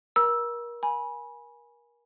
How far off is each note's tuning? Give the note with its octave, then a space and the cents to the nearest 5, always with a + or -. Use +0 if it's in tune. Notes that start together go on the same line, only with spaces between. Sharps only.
A#4 +30 A#5 +45 E6 +0
G#5 +0 B5 -25